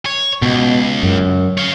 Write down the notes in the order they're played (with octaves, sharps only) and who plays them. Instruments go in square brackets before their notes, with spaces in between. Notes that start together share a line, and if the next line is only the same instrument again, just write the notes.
[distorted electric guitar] C#5
[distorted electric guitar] C#2 [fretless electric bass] B2
[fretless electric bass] F#2
[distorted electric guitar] C#5 F5